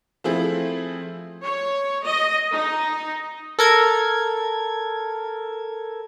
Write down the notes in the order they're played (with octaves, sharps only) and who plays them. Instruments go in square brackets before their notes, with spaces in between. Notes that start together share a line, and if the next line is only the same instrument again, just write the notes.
[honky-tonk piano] F3 A3 C4 E4 G#4
[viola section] C#5
D#5
D#4
[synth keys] A4 A#4 G#6